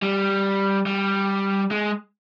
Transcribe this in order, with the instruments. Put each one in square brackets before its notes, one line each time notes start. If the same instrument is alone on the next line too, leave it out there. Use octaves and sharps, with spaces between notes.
[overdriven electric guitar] G3
G3
G#3